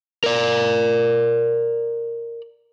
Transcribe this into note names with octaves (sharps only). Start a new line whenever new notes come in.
A#4 D5